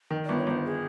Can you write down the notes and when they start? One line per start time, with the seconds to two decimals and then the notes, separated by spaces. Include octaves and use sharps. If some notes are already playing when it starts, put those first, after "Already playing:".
0.10 D#3
0.25 G1 D5
0.38 C#5
0.47 G1 C5
0.65 G#4